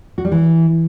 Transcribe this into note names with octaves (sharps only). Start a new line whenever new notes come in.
F#4
G3
E3